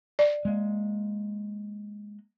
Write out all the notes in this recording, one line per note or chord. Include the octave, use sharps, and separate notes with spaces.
D5
G#3 A#3